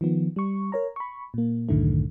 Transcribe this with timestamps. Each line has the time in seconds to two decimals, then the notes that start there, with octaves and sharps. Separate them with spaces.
0.01 D#3 F3 B3
0.36 G3 C#6
0.72 A#4 C#5 A#5
0.96 B5 C#6
1.34 A#2 A#3
1.69 C2 F#2 A2 D3 D#3 A3